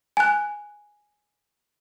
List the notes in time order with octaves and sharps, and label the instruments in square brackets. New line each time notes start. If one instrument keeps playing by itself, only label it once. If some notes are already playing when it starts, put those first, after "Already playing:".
[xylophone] G#5 F#6